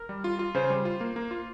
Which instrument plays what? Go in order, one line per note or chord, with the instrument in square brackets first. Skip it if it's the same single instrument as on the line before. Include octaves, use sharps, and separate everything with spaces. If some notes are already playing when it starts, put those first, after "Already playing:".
Already playing: [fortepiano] A#4
[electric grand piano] G3
F4
F4
[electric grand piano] C#3 [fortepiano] C5
[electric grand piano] G3
F4
A#3
A#3
F4